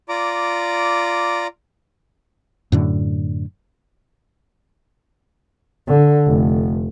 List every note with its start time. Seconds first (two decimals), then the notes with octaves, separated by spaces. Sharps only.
0.09 F4 D5 A#5 D6
2.72 F#2 A2 D3
5.87 D3
6.26 F1